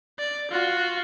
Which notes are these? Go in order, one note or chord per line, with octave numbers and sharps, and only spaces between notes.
D5
F4 F#4